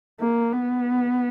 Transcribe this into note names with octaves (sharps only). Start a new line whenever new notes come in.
A#3
B3